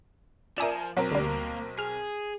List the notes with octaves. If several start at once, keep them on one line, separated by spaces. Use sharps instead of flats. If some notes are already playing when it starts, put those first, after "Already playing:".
F3 A#4 D5 E5 G#5 D#6 E7
B1 F#3 C4 A#4
D2 G3 A#3
G#4 F6